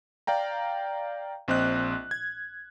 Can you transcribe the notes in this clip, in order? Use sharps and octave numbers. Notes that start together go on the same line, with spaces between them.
D5 F5 G5 A#5
A#1 C4 D#5 F#6
G#6